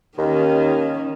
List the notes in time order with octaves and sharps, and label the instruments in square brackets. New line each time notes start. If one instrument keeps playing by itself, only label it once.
[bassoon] D#2 [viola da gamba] D#3 C#4